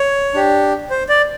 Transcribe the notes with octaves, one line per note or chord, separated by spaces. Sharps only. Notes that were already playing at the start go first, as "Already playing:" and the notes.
Already playing: C#5
D4 G4
C5
D5